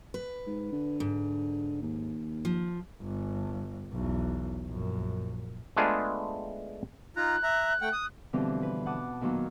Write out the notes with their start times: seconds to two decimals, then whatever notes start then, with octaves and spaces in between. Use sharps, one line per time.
0.14 B4
0.46 G#2
0.72 D3
1.00 G#2
1.82 D#2
2.45 F3
3.02 G1
3.93 B1 E2
4.67 A#1 F#2
5.77 G#3 A3 B3 D4 F4 G#4
7.16 D#4 F4 A#5 F#6
7.43 E5 A#5
7.81 A3 F#5 G5
7.93 D#6
8.33 B2 D3 E3 F3 G3 C4
8.63 B4
8.86 F#5 A5 D6 D#6
9.21 A#2 D#3 F#3 A#3 B3